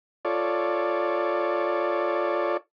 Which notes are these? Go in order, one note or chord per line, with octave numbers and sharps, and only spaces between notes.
F4 A4 C#5 D5